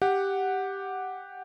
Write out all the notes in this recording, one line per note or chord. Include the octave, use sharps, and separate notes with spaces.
G4 F#5